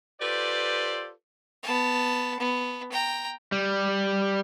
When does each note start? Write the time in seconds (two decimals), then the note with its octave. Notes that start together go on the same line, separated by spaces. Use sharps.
0.20 F4 G4 A4 B4 C5 D5
1.63 B3 A5
2.40 B3
2.92 G5 A#5
3.52 G3